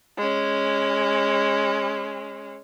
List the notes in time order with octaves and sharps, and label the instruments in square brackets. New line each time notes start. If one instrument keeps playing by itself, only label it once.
[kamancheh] G#3 C#4